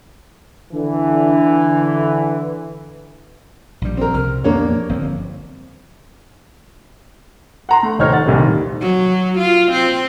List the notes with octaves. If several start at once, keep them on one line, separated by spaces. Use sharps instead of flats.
D3 E3
A#1 G3
C4 A#4
C2 F6
F2 A#2 A#3 B3 D4 C#5
G1 F3 C4
F#5 A#5 C6
A3
F1 D#2 D#4 C5 C#5 F6
F#5 A6
C2 A#2 D#3 G3
F#3
F4
C4